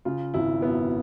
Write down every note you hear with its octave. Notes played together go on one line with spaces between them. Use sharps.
C#3 F4
G#1 E4
F#2 B3